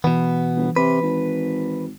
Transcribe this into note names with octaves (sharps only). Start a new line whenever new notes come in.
B2 E3 B3
G1
C3 B4
G#1